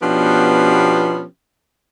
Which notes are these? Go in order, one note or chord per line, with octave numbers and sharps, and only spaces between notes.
B2 F3 B3 C#4 D4 G4